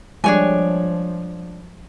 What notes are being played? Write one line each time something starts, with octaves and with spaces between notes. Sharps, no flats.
F3 G3 G#3 D4 C#5 G#5